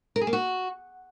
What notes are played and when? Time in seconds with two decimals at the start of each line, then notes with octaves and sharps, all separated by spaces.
0.16 A#4
0.21 G#4
0.27 A#3
0.33 F#4